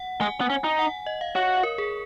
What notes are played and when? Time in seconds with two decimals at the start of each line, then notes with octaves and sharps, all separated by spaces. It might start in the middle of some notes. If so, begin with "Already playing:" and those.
Already playing: F#5
0.21 G#3 G#5
0.41 B3
0.50 C#4
0.64 D#4
0.79 F#5
1.06 D#5
1.21 F5
1.35 F#4 C#5
1.63 A#4
1.78 G#4